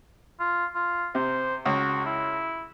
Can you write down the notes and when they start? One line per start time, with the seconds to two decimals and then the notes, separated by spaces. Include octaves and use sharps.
0.40 F4
0.75 F4
1.15 C3 C5
1.66 C#2 F#4
2.06 E4